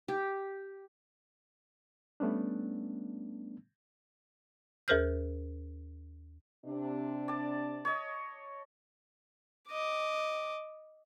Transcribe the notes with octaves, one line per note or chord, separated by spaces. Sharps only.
G4
G3 A3 B3 C#4 D4
D#2 G#4 A#4 C5 F6 G6
C3 D4
D5 A5
C#5 D#5
D#5 D6